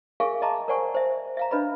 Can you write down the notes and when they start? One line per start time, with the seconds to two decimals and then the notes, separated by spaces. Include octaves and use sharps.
0.20 G#4 A#4 E5 F5 G#5 C#6
0.42 D#5 E5 A5 A#5 C6 D6
0.68 A#4 C5 D5 F#5 G#5 C#6
0.95 C5 E5
1.37 E5 F5 A#5
1.51 D4 B4 D#5 B5